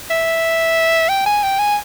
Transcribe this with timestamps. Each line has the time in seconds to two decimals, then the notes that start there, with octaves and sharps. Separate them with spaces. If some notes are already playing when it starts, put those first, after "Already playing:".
0.11 E5
1.09 G5
1.26 G#5
1.43 G5
1.59 G#5